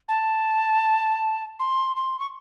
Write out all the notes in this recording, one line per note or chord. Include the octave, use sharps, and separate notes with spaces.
A5
C6
C6
C#6